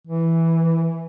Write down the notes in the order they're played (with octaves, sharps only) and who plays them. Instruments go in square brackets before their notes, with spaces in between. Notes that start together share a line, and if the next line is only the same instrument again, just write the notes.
[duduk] E3